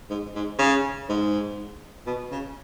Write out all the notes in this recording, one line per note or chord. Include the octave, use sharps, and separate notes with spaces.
G#2
G#2
C#3
G#2
B2
C#3